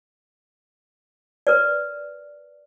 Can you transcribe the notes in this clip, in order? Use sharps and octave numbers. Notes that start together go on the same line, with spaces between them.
A#4 B4 D5